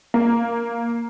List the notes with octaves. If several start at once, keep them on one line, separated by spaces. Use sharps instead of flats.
A#3